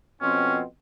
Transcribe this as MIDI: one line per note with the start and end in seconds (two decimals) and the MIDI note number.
0.22 0.62 41
0.22 0.62 47
0.22 0.62 60
0.22 0.57 61